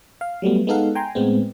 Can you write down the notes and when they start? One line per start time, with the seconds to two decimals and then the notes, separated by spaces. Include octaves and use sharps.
0.21 F5
0.42 F#3 G3 A3 B3
0.67 G#3 B3 D#4 A4 F5 F#5
0.95 G5 G#5 A#5 C6
1.15 A2 G#3 B3 C4